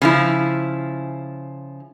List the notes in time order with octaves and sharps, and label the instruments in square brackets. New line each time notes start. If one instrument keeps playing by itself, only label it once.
[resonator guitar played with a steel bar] C#3 F3 E4